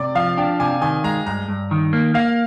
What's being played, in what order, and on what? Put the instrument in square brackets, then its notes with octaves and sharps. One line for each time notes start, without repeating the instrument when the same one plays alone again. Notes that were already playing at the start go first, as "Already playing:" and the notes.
Already playing: [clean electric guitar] C3 [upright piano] D5
[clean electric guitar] F3 [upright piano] F5
[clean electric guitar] D4 [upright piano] G5
[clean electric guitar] C3 [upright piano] G#5
[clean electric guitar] D#3 [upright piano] G#5
[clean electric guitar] G#3 [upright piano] A#5
[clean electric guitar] G2 [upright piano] A#5
[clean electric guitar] G2
D#3
A#3
[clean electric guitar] A#3 [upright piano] F5